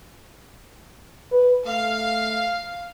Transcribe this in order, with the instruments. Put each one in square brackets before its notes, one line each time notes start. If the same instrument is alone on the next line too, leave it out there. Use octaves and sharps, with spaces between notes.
[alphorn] B4
[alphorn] A3 [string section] F5